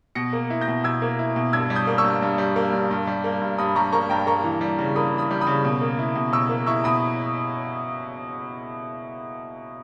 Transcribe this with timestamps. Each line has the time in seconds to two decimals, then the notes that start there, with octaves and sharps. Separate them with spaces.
0.15 B2 A#6 C#7
0.33 A#3
0.50 E4
0.61 G6 A#6
0.68 B2
0.84 B2 E6 G#6
1.02 A#3
1.19 E4
1.36 B2
1.53 G2 E6 G#6
1.70 G3
1.76 D#6 G6
1.87 A#3
1.98 C#6 E6
2.04 G2
2.22 G2
2.38 G3
2.56 A#3
2.73 G2
2.91 G2
3.07 G3
3.24 A#3
3.41 G2
3.58 G2 B5 D#6
3.76 G3 A#5 C#6
3.92 A#3 A#5 C#6
4.10 G2 G5 A#5
4.27 A#3 A#5 C#6
4.44 E3
4.61 G3
4.79 C#3
4.96 A#3 B5 D#6
5.13 E3
5.18 B5 D#6
5.31 G3
5.41 B5 D#6
5.47 C#3
5.65 B2
5.81 A#3
5.99 E4
6.15 B2
6.33 B2 C#6 E6
6.49 A#3
6.67 E4 C#6 E6
6.84 B2 B5 D#6